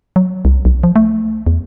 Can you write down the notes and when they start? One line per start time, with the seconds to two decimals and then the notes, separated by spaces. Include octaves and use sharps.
0.16 F#3
0.45 C2
0.65 B1
0.83 F3
0.96 A3
1.47 E2